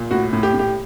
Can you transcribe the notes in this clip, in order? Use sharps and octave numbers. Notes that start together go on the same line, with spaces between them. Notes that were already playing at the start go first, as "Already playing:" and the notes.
Already playing: A#2
A2 F#4
A2
G4
A2
G4